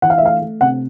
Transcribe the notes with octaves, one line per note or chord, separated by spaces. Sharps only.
E3 F#5
F5
E5
A3 F5
A3
C3 F#5